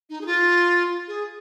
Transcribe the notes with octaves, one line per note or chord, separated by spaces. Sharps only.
D#4
G#4
F4
G#4